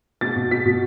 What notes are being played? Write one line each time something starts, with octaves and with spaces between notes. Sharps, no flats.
B2 A6
B2
B2 B6
B2